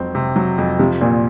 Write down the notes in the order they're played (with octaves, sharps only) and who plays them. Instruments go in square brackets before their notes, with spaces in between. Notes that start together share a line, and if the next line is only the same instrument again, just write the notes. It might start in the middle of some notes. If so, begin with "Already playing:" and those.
Already playing: [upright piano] F2 F#3 C4
C3
F#3
F2
[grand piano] C3 [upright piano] F3
[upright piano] A#1 [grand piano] A#2